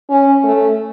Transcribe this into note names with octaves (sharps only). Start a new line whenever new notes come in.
C#4
A3